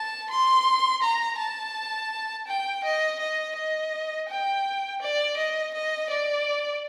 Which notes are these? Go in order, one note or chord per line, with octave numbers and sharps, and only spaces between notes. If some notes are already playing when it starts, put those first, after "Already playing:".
Already playing: A5
C6
A#5
A5
G5
D#5
D#5
D#5
G5
D5
D#5
D#5
D5